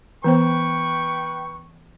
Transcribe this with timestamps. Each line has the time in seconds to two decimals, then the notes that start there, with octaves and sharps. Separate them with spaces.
0.24 E3 B3 B4 C5 G5 C#6